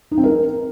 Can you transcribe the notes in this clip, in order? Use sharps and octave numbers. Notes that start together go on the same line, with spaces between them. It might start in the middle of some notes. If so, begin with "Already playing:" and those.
D#4
C4
A#4